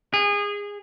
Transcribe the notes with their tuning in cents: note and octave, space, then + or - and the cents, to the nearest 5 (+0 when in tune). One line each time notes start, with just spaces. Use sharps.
G#4 -25